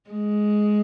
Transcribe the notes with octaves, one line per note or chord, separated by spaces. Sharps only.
G#3